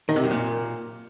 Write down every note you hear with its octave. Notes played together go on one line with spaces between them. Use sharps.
D#3
C3
F#2
A#2